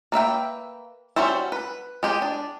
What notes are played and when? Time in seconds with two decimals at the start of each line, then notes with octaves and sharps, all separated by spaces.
0.12 A#3 B4 E5 G5
1.16 G3 C#4 F#4 C5 E5
1.52 B4
2.03 G#3 G4 G#4
2.22 D4